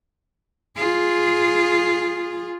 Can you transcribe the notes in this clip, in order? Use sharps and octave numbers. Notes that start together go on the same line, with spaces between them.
F4 G#4